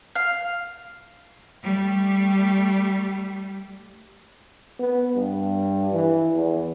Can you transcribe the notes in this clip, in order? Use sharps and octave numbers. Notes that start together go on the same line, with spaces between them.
F5
G3 A3
B3
G2
E3
E2